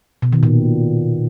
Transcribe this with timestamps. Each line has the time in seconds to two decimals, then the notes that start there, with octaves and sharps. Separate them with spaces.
0.22 B2
0.33 D#3
0.43 A#2